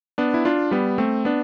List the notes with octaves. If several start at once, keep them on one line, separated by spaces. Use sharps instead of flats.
B3 D4
E4
D4 F4
G3 B3
A3 C4
B3 D4